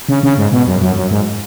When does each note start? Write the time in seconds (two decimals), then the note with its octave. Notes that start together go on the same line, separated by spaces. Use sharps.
0.09 C#3
0.23 C#3
0.38 G#2
0.52 B2
0.67 F#2
0.82 F#2
0.96 F#2
1.11 G#2